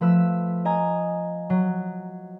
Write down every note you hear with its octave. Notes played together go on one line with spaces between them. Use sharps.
F3 A3 B4 B5 E6
D#5 G#5 A#5
F#3